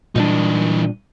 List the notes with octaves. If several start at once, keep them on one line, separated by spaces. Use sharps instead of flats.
A#2 E3 G3 D4 D#4